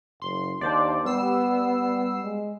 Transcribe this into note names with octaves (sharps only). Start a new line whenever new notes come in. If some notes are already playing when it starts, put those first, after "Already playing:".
F#1 C6
D#2 D4 C5 D5
G3 B3 E6 C7
G#3